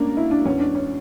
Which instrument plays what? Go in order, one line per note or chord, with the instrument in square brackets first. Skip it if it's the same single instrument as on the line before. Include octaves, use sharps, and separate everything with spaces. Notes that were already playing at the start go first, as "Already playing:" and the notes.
Already playing: [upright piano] A#3 C#4 D4
E4
D4
E2 E3 C#4
D4
C#4